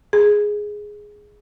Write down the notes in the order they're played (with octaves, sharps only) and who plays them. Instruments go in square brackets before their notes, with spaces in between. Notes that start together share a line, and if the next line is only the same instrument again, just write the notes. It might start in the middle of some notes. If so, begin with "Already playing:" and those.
[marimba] G#4